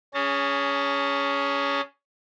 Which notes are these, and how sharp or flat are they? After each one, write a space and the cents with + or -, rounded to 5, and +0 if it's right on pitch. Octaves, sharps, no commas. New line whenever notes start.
C#4 +15 G#4 +0 A5 +40